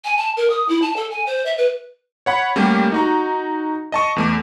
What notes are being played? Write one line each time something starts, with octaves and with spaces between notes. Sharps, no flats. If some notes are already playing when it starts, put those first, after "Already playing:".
G#5
A5
A#4
D#6
E4
A5
A4
G#5
C5
E5
B4
C#5 F#5 B5
G3 A3 A#3 C#4 G4
D#4 F#4 A#5
D#5 A5 C#6
E2 A3 D6